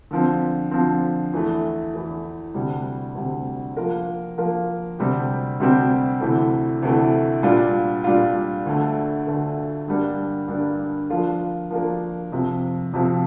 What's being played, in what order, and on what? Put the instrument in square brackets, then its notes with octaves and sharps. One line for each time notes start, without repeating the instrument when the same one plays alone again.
[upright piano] D3 F3 C4
D3 F3 C4
E2 E3 A3
E2 E3 A3
D2 C3 G3
D2 C3 G3
F3 A#3 F4 A#4
F3 A#3 F4 A#4
D2 C3 G3 C4 G4
D2 C3 G3 C4 G4
D2 C3 E3 A3
D2 C3 E3 A3
A#2 G3 D4 F4
A#2 G3 D4 F4
D2 D3 A3
D2 D3 A3
G2 D3 G3 A#3 D4
G2 D3 G3 A#3 D4
F3 A#3 D4 F4 A#4
F3 A#3 D4 F4 A#4
F2 C3 F3
F2 C3 F3